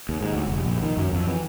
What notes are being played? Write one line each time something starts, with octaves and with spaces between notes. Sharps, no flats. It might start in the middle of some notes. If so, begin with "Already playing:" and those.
D#2
G#2
D2
F1
A#1
D#3
F#2
F2
E3